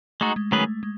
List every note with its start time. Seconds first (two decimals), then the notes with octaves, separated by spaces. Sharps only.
0.21 G#3 A3 D#4 F#4
0.36 G#3
0.51 D#3 F#3 A3 C#4 G#4 B4
0.83 G#3